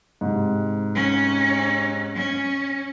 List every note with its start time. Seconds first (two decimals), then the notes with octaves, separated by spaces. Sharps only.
0.21 G#2 C3
0.95 C#4
2.15 C#4